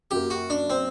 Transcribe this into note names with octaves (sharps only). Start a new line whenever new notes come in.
F#2 F#3 A#3 G4
F#4
D4
C4